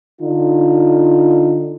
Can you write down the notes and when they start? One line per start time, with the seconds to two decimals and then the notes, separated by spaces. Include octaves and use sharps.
0.21 D3 D#4 F4